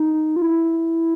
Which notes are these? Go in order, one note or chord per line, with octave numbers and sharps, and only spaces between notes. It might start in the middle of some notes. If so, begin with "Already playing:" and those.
Already playing: D#4
F4
E4